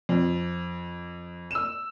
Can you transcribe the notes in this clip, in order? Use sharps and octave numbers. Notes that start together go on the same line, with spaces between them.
F2
E6 E7